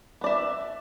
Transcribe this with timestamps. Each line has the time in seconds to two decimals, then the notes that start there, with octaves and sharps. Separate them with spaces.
0.21 B3
0.24 D5
0.26 E5